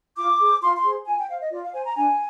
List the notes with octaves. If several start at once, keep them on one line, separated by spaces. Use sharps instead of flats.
F4 D6
G#4 C5
F4 C6
C6
G#4 C5
F4 G#5
G5
C5 F5
D#5
F4 D5
F5
C5 G#5
A#5
D4 G#5